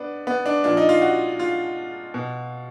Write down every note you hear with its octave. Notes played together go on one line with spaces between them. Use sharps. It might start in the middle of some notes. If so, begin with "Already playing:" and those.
Already playing: B3 D4
B3
D4
A#2 F3 D4
D#4
F4
F#4
F4
B2